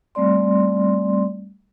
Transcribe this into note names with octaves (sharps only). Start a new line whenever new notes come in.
G3 A3 C4 D5 C6